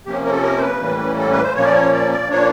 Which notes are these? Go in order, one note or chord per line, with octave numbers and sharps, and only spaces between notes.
C3 F3 A#3 C#4 G4
A#4
A4
A#4
C5
B4
A2 E3 G3 A#3 C#4
A4
B4
C5
A#2 F3 A#3 C#4 C#5
D5
C#5
D5
D5
A#2 F3 A#3 D4 C#5